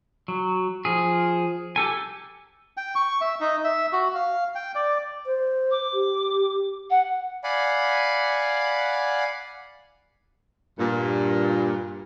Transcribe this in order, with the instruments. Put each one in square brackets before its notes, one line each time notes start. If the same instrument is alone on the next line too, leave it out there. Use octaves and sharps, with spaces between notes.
[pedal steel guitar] F#3
F3 G#4
G4 A4 G#5
[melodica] G5
C#6
E5
D#4
E5
F#4
F5
G5
D5
[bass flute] C5
[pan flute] D6
[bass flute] G4
[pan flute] F#5
[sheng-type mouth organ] D5 F5 F#5 G#5 B5
[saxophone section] G2 A#2